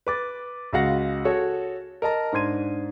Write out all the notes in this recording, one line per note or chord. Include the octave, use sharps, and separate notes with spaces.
B4 D6 A6
C#2 G#3 F#4 F5 F#5 A#6
F#4 G#4 A4 C#5
A#4 D#5 A5 A#5
G#2 D4 C5 C6 G#6 D#7